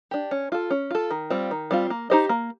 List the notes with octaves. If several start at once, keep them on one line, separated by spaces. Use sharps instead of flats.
D4 G4
C#4
F4 A4
C#4
F4 A4
D#3
G3 C4 F4
D#3
G3 C4 F4
A#3
D#4 G4 C5 D#5
A#3